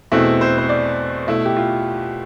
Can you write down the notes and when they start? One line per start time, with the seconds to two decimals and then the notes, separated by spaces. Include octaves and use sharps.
0.12 E2 B2 A3 C4 E4
0.41 C5
0.58 C5
0.69 D5
1.27 B2 A3 E4
1.45 G4
1.56 F4